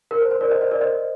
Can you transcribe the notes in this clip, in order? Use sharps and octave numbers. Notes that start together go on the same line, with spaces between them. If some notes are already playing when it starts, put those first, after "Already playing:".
A#4
C5
C5
A#4 D5
C5 D#5
C5 D#5
A#4 D5
C5 D#5